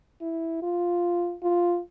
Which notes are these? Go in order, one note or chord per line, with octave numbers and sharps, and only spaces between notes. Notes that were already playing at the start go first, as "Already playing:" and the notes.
E4
F4
F4